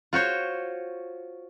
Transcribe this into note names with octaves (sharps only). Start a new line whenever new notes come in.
F4 F#4 C5 C#5